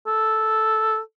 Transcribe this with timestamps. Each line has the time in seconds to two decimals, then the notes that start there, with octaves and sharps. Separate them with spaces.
0.07 A4